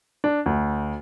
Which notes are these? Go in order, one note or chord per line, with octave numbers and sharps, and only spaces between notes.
D4
D2